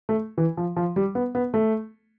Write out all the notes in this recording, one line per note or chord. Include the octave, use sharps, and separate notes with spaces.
A3
E3
F3
F3
G3
B3
B3
A3